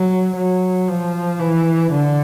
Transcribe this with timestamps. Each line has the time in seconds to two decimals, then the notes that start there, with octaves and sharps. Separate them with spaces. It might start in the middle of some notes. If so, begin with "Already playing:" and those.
Already playing: F#3
0.36 F#3
0.88 F3
1.40 E3
1.92 D3